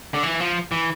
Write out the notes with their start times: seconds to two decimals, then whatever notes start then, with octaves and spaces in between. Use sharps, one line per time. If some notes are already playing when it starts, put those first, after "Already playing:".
0.14 D3
0.23 E3
0.40 F3
0.72 E3